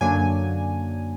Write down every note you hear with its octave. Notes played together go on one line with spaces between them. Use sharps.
F#2 D3 F#3 A#3 D4 G#5